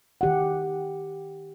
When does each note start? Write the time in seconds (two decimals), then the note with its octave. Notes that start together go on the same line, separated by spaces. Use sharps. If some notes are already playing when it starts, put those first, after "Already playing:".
0.21 D#3 G4 F#5